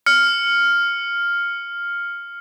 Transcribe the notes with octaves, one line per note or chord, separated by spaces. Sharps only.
F6 C#7